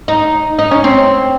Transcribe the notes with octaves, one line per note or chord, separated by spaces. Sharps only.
D#4
D#4
C#4
C4